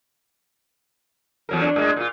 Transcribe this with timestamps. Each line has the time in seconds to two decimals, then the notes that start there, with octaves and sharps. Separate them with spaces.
1.49 E2 F#3 A#4
1.61 D4
1.76 A2 G#3
1.96 A#2 F4